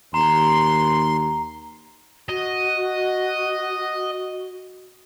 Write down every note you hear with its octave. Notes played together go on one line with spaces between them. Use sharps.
D#2 A#5 C6
F#4 D#5